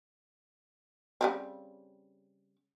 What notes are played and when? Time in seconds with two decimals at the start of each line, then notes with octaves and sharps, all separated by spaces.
1.21 C#3 G3 C4